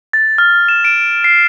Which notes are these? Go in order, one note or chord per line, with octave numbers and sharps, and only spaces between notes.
A6
F6
E7
D7
C7